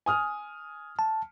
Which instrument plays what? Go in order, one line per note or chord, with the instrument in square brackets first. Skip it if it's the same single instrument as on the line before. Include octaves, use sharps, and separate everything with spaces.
[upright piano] G#5 D#6 F6
[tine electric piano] A5